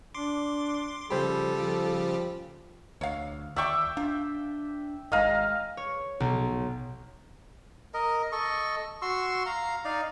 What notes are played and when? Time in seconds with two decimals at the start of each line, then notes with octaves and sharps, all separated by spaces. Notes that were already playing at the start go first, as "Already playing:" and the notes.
0.14 D4 C6 D6
1.10 C#3 F3 G3 G4 A4 C5 B5
1.56 F3
3.01 D2 C#5 F5
3.56 D#2 D5 E5 G5 C#6 D6
3.97 D4 F4
5.12 G#1 G#2 D#4 G#4 D#5 F5 A#5
5.77 C#5
6.20 B1
7.94 A#4 D#5
8.32 A4 D#5 C#6
9.02 F#4 C6 C#6 E6
9.46 F5 A#5
9.85 D#4 D5 F5